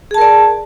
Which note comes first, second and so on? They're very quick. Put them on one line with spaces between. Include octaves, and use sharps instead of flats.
G#4 A5 A#4 D5